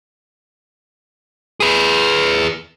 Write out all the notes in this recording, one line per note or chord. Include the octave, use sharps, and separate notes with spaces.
G#4 B4